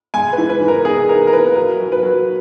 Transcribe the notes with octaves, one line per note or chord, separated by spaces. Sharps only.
G#3 G#5
B4
E3
B4
E3
A#4
D#4 G#4
D#4 A#4
A#4
E3 B4
F#3 A#4
F#3
B4
F#3